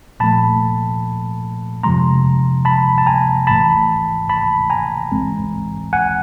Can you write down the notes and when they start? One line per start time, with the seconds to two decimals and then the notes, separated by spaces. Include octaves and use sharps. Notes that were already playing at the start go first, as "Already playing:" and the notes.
0.20 A#2 F3 A3 A5 B5
1.83 F2 C3 F3 G#3 A#5 C6
2.65 A5 B5
2.98 A5
3.07 G#5 A#5
3.47 A1 G#2 E3 A3 A5 B5
4.30 A5 B5
4.70 G#5 A#5
5.12 A1 G#2 E3 G#3 C4
5.93 F#5 G#5